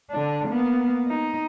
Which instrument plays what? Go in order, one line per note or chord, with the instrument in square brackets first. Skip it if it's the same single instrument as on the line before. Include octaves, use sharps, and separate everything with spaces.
[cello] D3 D4
A#3 B3
D#4